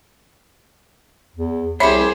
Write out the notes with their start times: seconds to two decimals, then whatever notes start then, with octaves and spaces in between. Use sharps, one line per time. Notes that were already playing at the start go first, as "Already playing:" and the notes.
1.35 E2
1.80 C2 C4 G4 G#4 C5 C#5 E5 B5